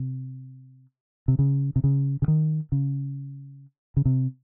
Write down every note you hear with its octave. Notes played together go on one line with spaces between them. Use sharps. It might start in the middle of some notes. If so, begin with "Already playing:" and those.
Already playing: C3
C3
C#3
C3
C#3
C#3
D#3
C#3
C#3
C3